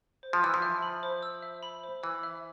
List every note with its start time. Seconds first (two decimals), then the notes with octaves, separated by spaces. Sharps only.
0.23 C5
0.33 F3
0.43 E3 E6
0.54 F3
0.62 E5
0.82 B5
1.03 C5
1.23 E6
1.43 E5
1.63 B5
1.84 C5
2.03 E3 E6
2.23 E5